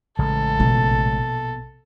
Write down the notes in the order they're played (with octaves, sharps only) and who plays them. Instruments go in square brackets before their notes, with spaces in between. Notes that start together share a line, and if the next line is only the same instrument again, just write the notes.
[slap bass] A1 C#3 G#3 [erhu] A4
[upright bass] A#1 B2